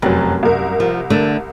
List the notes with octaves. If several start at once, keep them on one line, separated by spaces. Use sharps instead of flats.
F1 F#2 F#3
C2 A#4
F3
D3 A3